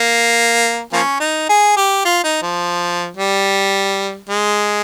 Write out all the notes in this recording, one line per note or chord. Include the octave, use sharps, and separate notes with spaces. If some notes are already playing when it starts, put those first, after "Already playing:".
Already playing: A#3
F3 A#3 C#4
D#4
G#4
G4
F4
D#4
F3
G3
G#3